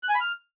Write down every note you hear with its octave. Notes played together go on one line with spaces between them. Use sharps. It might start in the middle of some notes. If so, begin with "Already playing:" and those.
F#6
G#5
B5
F6